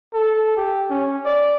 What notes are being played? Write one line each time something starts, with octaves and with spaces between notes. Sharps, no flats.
A4
G4
C#4
D5